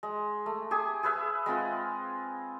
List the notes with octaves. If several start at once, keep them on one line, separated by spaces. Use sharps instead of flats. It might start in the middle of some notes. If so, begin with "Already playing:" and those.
G#3
A3
G4 G#4 G#5
G#4 B4 E5
G#3 C4 F4 B4